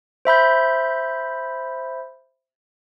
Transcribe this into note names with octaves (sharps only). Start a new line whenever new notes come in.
C5 E5 B5 G6